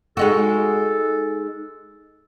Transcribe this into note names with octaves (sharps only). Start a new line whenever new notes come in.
G#3 D#4 F#4 A4